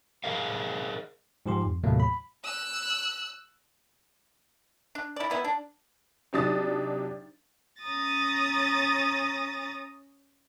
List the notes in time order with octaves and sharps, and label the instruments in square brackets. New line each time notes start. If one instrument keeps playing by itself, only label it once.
[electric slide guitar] G#4 A#4 D#5 F5
[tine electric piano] G#2 F3 G4 C6
F2
D#2 A2 C3 F#3 A3 A#3
B5
[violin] E6 F#6
[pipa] D4
E4 D5
D#3 B3 E4
D4
[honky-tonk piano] C3 F#3 D4 D#4 D#6 A6
[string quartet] C#4 A#5 D#6 A6 A#6